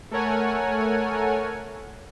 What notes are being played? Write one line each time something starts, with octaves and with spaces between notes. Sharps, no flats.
A3 A4 A#4 C#5 F#5 G#5